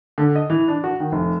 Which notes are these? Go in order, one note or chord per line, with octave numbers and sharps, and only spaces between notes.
D3
D#5
E3
D4
F#4
D#3
F1